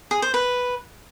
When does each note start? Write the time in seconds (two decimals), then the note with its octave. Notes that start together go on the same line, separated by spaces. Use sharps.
0.11 G#4
0.22 C5
0.34 B4